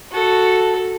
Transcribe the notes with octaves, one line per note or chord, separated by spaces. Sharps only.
F#4 A4